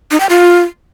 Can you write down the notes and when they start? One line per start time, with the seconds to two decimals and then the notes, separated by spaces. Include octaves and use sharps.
0.11 D#4
0.20 G5
0.29 F4